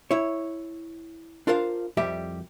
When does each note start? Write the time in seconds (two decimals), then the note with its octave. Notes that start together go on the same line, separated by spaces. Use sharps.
0.11 E4 C#5
1.47 D4 F4 A#4 C5 F5
1.97 C2 F2 G3 G4 E5